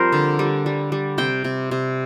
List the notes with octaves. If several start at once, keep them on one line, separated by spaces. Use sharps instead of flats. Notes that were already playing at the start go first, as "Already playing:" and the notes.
Already playing: F3 G3 C4 A#4 C5
D3
G3
G3
G3
C3 G5
C3
C3